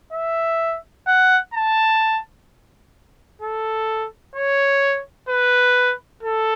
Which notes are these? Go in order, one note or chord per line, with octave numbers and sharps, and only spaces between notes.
E5
F#5
A5
A4
C#5
B4
A4